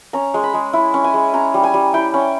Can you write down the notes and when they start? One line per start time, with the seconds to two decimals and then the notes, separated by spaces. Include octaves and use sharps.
0.13 C#4 A#5
0.34 G#3
0.43 B5
0.54 G#3
0.73 E4
0.94 C#4
1.04 G#5
1.14 G#3
1.33 C#4 A#5
1.54 G3
1.63 G#5
1.74 G3
1.94 E4 G5
2.14 C#4